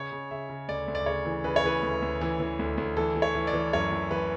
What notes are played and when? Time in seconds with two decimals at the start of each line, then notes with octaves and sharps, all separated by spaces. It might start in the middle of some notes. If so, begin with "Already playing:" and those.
Already playing: C#3 C#5
0.12 C#3
0.31 C#3 E5
0.49 C#3
0.68 D2 D5
0.88 D2
0.95 D5
1.06 C#3 C#5
1.26 E3
1.44 C#3 B4
1.56 C#5
1.64 E3 B4
1.83 D2
2.02 D2
2.21 E3
2.40 E3
2.59 D2
2.78 D2
2.97 E3 A4
3.16 E3
3.22 C#5
3.35 E3
3.47 D5
3.53 E3
3.73 F#2 C#5
3.92 E3
4.11 E3 B4